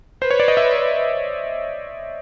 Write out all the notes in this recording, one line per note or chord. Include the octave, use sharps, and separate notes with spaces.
B4 C5
C#5
D5
D#5
E5